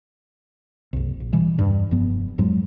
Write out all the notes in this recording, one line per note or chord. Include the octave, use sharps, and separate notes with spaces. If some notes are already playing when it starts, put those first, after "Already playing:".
F#1 C2
A#1
B2 E3 G3
E2 G2
F1 G2 F3 B3
F2 G#2 F#3 G#3